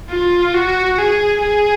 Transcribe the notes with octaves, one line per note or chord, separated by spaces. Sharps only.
F4
F#4
G#4
G#4